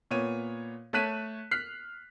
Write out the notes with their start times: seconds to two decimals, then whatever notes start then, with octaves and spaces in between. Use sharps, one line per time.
0.11 A#2 B3 C#5 D#7
0.93 A3 C#5 A5 F#6 B6 D#7
1.51 F6 F#6 B6 C7